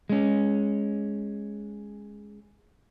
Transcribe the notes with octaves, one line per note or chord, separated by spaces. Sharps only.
G#3 C#4